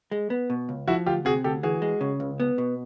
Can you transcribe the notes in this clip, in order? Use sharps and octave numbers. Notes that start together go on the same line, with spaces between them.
G#3
B3
B2
C#2
F3 E4 F#4
D2 F4 G4
C3 F#4 G#4
D2 G4 A4
E3 F#4 G#4
G#3
C#3
C#2
B3
B2